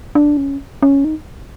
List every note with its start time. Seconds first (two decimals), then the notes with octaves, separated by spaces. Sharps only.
0.15 D4
0.37 C#4
0.83 C#4
1.05 D#4